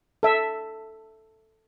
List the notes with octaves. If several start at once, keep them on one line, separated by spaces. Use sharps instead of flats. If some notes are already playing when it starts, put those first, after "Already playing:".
A4 E5